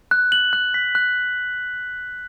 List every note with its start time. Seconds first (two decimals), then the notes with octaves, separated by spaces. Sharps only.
0.11 F#6
0.32 F#7
0.53 F#6
0.74 B6
0.95 F#6